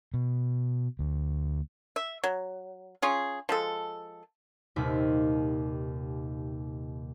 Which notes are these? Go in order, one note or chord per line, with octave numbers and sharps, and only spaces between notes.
B2
D2
E5
F#3
C#4 F4 G#4
F3 G#3 A4
D#1 D#2 C3 B6